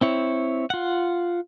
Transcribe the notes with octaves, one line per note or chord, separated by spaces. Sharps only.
C4 E4 C#5
F4 F#5